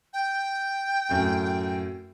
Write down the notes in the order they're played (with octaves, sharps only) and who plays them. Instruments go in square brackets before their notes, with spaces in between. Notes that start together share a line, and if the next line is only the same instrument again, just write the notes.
[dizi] G5
[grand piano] F#2 A2